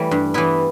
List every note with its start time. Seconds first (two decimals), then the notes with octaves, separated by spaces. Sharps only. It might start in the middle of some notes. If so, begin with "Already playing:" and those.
Already playing: E3 G3 A3
0.11 G2
0.34 E3 B3 E4